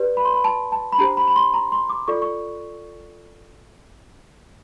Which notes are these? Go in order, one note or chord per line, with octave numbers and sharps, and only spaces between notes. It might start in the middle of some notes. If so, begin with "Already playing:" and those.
Already playing: G4 B4 D5
B5
C6
B5
A5
A5
B5
D4 G4 C5 A#5
B5
B5
C6
A#5
C6
D6
F4 A4 D5 C#6
C#6